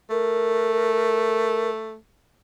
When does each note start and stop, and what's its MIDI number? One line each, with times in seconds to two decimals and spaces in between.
0.10 1.96 57
0.10 1.69 70